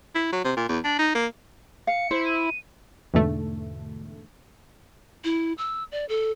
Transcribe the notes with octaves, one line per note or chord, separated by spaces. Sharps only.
E4
F#3
C3
A#2
E2
D4
D#4
A#3
F5 C#7
E4 C5
D#7
E2 G#2 B2 D3 A3
E4
E6
D5
A4